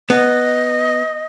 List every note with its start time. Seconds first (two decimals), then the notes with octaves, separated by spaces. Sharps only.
0.10 B3 D#5